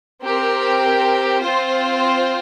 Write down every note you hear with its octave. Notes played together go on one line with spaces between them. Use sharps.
C4 G4 A#4
C4 F4 C5